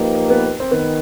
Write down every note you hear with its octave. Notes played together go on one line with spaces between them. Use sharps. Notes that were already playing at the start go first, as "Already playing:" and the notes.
Already playing: F3 A#3 D#4 G4 B4
B3
C4
D#3 B3